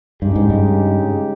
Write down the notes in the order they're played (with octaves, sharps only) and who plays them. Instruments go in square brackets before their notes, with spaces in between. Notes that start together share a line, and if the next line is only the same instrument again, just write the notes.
[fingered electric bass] G2 [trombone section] C#3 G#3 D#4 G4
[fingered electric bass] G#2
G2